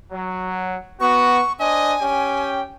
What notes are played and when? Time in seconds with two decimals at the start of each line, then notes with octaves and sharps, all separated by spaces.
0.12 F#3
1.00 B3 F#4 C#6
1.59 D4 C5 D#5 G#5
2.01 C#4 G4 G5